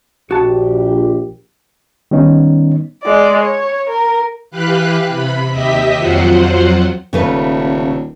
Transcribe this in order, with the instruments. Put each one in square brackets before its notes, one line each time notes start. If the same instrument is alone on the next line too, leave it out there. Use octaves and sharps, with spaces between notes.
[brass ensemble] A#1 [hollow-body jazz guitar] F#4 A5 [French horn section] G4
[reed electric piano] D#3 G3 B3 C#4 D#4
[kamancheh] G#3 D5
C#5
A#4
[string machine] E3 G4 B4 F5 F#6
C3 B5
D#2 G4 D#5 E5 B6
F2 F#3 F4 C5 F#5
[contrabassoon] D#1 [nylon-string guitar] C#3 A3 B4